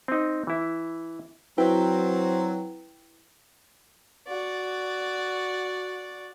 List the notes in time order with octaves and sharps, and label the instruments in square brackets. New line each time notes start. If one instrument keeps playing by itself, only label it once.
[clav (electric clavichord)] C4 D#4
E3 E4
[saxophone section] F#3 C4 [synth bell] E4 B4 G5
[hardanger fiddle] F#4 D5